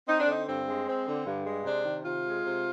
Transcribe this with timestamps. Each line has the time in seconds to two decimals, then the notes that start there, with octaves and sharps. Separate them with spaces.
0.07 C4 D#4
0.18 D4
0.27 D3 D#4
0.47 G2 C4
0.67 G#3
0.86 C4
1.06 D3
1.25 G2
1.46 G#3
1.65 C3 D4
1.85 D#3
2.04 C3 F4
2.24 G#3
2.43 C3